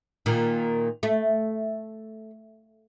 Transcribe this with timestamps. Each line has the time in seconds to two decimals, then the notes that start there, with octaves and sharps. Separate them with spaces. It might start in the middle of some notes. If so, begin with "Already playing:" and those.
0.26 A#2 D#3
1.03 A3